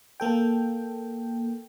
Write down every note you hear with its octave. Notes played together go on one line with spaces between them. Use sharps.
A#3 A4 G5